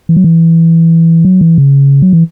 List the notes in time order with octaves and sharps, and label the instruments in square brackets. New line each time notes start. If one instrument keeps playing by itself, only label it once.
[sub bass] E3
F#3
E3
F#3
E3
C#3
F#3
E3